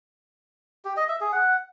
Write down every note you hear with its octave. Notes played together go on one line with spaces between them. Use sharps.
G4
D#5
E5
G#4
F#5